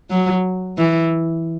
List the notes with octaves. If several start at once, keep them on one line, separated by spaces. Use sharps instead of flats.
F#3
E3